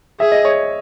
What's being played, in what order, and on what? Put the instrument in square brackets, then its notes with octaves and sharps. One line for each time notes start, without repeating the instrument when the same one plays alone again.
[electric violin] G#4 [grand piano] E5
[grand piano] D#5
C#5